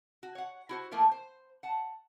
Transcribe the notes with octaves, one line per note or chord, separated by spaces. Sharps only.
F#4
C#5 F#5
E4 F#4 C5
F3 A3 A#3 E4 F4
C5
F#5 A5